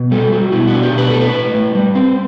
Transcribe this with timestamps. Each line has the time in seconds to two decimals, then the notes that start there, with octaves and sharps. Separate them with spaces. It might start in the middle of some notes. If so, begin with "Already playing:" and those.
Already playing: B2
0.11 G3 A4
0.32 G3 F#4
0.52 B2 E4
0.67 F#4
0.72 D4
0.83 G4
0.93 B2
0.98 B4
1.10 A2 A4
1.21 B4
1.34 A2
1.54 A2
1.75 G3
1.95 C4